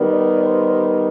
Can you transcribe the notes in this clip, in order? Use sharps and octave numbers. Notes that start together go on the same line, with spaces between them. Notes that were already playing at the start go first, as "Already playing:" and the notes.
Already playing: D#3 G3 B3
D5
C5